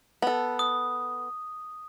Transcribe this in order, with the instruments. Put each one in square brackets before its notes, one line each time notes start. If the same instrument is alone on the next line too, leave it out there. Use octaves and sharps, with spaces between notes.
[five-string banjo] B3 A4
[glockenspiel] D#6